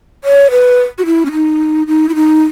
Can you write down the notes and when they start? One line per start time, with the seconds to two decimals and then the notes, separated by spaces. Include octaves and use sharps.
0.24 C#5
0.51 B4
0.98 F#4
1.06 E4
1.25 C#4
1.32 D#4
1.87 D#4
2.09 E4
2.15 D#4